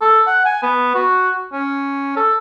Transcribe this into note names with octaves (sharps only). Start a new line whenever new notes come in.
A4
F#5
G#5
B3
F#4
C#4
A4